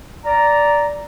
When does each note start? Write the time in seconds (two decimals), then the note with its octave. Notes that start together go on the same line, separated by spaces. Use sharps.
0.25 D5 A#5